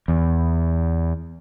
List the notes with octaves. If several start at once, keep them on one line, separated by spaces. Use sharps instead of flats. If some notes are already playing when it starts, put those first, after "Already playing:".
E2